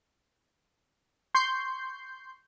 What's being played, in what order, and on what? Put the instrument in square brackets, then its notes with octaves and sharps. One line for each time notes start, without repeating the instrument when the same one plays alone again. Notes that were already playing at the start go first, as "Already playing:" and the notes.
[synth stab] C6 C#6 G6 C7